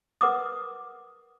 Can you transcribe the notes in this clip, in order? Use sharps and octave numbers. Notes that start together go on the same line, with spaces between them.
A#4 B4 F#5 D6 D#6